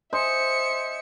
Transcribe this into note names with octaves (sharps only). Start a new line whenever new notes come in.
C5 D#5 E5 G#5 C#7